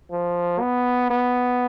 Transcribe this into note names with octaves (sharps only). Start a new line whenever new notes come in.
F3
B3
B3